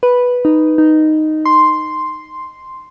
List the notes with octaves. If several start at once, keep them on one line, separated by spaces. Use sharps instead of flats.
B4
D#4
D#4
C6